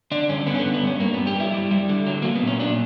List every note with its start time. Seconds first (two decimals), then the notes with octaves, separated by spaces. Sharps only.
0.11 D3 D4
0.29 G2 C#4
0.47 D3 B3
0.55 C#4
0.60 B3
0.65 G2
0.74 B3
0.83 G2 C#4
1.00 G2 A#3
1.14 G2 B3
1.27 G4
1.36 G3 E4
1.53 G3
1.71 G3
1.89 D3
2.07 F#3
2.22 F#3 A#3
2.35 B3
2.42 A#2
2.48 C#4
2.60 A#2 D4